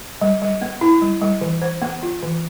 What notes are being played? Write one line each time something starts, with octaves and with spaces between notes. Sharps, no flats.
G3
G3
B3
E4
G3
G3
E3
C5
B3
F4
E3